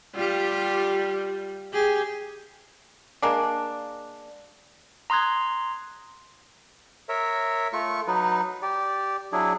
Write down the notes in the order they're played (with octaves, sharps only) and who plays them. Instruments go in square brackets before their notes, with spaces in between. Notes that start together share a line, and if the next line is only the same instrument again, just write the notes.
[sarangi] G3 [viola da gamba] F4 G4
[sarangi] G4 [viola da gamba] G#4
[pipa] G#3 A#3 D4
[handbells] A#5 C6 D#6 F#6 G#6
[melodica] A#4 C#5 E5
A3 F4 C#6
F#3 D#4 B4
G4 D5
F#3 D4 E4 G#4